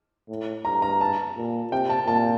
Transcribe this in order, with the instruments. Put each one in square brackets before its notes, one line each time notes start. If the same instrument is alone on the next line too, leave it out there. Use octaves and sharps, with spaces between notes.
[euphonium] A2
[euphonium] G2 [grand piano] A#5
[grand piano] A#5
A5
[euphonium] A#2
[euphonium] C3 [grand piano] G5
[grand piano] A5
[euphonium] A#2 [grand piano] A5